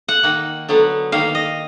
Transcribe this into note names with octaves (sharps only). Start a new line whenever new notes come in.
F#5
D#3 A#3
D3 F#3 B3
D#3 A#3 F5
D#5